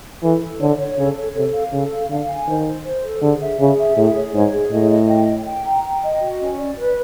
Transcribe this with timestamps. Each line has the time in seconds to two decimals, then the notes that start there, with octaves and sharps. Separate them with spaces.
0.23 E3 A4
0.42 A4
0.61 D3 C#5
0.79 C#5
0.98 C#3 A4
1.17 C#5
1.35 C3 A4
1.54 F5
1.73 C#3 A4
1.91 F5
2.10 D3 F5
2.28 G#5
2.48 D#3 C5
2.66 C5
2.85 C5
3.03 A4
3.22 D3 G#4
3.41 E5
3.60 C#3 G#4
3.78 E5
3.97 A2 G#4
4.15 C#5
4.34 G#2 C#5
4.52 G#4
4.71 A2 D#5
4.90 D#5
5.09 G5
5.28 G5
5.46 G5
5.65 A#5
5.84 G5
6.02 D#5
6.21 F#4
6.40 C#4
6.58 D5
6.77 B4